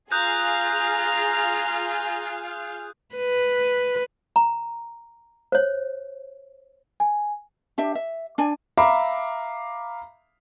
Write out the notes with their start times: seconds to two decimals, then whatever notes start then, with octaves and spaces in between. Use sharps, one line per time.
0.12 F4 G#4 F5 A#5 D#6 F#6 G6
3.16 B4
4.36 A#5
5.52 C5 C#5
7.00 G#5
7.78 D4 G4 E5
7.95 E5
8.38 D4 D5 G#5
8.78 E5 F5 A#5 B5 D6